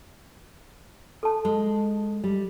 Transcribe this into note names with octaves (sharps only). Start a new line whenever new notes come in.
A4 A5
G#3
G3